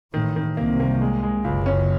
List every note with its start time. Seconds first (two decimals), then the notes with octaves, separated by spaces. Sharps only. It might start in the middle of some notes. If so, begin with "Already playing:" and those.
0.14 A1 A2 D#3
0.36 D#3
0.57 C2 C3 A#3
0.80 A#3
1.01 G#3
1.23 G#3
1.44 F#1 C#2 F#2
1.66 C#4